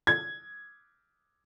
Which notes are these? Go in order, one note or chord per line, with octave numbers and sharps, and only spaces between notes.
G#6